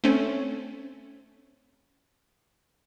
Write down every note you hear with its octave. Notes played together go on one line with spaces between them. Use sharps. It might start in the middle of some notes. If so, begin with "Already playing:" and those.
A3 C4 C#4